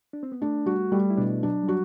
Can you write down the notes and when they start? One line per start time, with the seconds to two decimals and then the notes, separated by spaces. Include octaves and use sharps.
0.13 D4
0.23 C4
0.32 B3
0.42 A3 D4
0.66 G3 F#4
0.92 G3 A3
1.10 E4
1.17 B2 D4
1.43 F#3 D4
1.63 G3
1.68 F#3 F#4